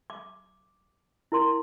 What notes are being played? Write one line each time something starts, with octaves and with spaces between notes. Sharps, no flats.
D6
E4 A#4 C6